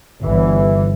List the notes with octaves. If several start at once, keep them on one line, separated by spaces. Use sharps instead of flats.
G1 E3